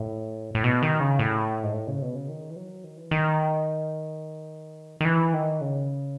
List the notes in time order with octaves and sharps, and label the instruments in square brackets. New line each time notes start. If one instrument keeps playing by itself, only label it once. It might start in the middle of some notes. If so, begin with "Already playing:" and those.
Already playing: [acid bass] A2
A2
B2
D#3
C#3
A2
G#2
A2
C#3
B2
C#3
D#3
E3
F#3
D#3
E3
D#3
D#3
E3
D#3
C#3